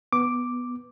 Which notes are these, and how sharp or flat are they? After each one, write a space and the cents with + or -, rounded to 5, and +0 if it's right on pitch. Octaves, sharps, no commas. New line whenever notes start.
B3 +0 D6 +0